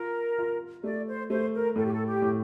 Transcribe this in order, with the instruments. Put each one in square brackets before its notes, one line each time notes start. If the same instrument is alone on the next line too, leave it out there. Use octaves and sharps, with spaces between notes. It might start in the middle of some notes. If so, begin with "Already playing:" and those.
Already playing: [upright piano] F4 [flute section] A#4
[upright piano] F4
[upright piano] A3 [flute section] D5
[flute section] C5
[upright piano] A3 [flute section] C5
[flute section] A#4
[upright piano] A2 [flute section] A4
[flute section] G4
A4
G4
[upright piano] A2